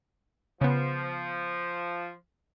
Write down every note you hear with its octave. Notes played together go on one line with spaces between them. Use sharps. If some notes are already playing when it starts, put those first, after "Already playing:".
C#3 F3 B3